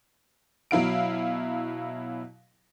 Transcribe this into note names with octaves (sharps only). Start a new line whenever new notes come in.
B2 F#3 E4 F5 D7